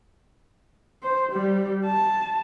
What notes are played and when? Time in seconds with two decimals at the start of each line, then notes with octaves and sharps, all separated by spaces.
1.03 C5
1.32 G3
1.86 A5